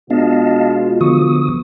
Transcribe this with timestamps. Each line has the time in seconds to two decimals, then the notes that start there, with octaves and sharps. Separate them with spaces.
0.10 B2 G#3 B3 D4 F4 D#5 F5 A5
1.01 D3 F3 B3 C#6 D#6